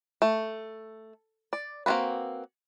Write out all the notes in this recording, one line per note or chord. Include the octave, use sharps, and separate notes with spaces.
A3
D5
A#3 C4 C#4 F#4 B4